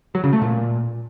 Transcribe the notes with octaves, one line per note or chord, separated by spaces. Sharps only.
F#3
C#3
A3
A#2